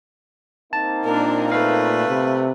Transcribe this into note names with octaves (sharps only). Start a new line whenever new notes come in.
A#3 C4 D#4 A5
A#2 D4 A#4
A3 B4 F5
C3